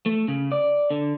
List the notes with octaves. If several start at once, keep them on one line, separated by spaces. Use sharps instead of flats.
A3
C#3
D5
D3